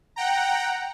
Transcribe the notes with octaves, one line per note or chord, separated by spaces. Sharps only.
F#5 G5 A#5